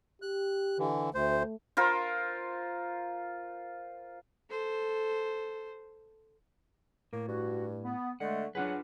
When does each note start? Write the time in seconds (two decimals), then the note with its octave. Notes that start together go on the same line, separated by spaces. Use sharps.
0.22 G4 F#6
0.78 D3 E3
1.14 D2 A3 C5
1.77 F4 A#4 C5
4.49 A4 C5
7.13 A2 A#3
7.28 G2 F#4
7.83 B3
8.20 D3 G#3 A3 F#5
8.55 F#3 D4 F4 G#4 B4 F#5